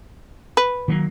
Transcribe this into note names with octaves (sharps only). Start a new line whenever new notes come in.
B4
D#3 F#3 A#3